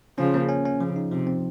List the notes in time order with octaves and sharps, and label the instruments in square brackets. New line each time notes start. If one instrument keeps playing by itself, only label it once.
[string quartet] C#3 F3 [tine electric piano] C#4
[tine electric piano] A#3
C#4
C#4
[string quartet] C#3 [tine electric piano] F3
[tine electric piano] D#4
[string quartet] C3 [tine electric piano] F3
[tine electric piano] C4